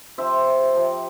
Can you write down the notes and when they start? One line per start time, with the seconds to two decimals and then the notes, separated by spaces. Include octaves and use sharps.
0.18 C3 F3 C5 E5
0.74 C3 F3